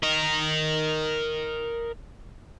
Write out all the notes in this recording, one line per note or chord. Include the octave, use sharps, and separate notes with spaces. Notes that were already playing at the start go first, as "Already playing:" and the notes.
A#4 D#5